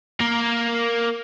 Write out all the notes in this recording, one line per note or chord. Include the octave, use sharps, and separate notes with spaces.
A#3